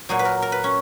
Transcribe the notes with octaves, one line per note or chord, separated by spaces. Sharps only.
A#2 F#3 G#4
B4
A#4
A#4
B4
C#4